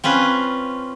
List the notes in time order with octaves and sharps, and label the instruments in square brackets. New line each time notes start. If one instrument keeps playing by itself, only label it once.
[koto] C4 C#4 F4 B4